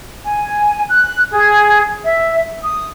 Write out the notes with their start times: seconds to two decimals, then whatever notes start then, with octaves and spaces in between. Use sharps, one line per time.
0.25 G#5
0.89 F#6
1.31 G#4
2.04 E5
2.62 D#6